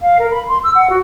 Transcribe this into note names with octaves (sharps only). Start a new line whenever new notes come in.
F5
A#4
B5
C6
E6
F#5
F#4